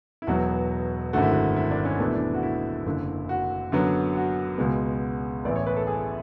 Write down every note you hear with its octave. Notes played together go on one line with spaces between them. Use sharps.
E4
E1 E2 B2 F#3 B3 F#4
G#1 F#2 D3 A3 F#4
E4
F#4
E4
D4
C#4
E2 B2 A3 D4
E4
D4
F#4
E4
F#1 F#2 D3
F#4
F#2 D3 F#3 B3
F#4
C#2 B2 G#3 B3
A1 A2 E3 B3 D5
C#5
B4
A4
G#4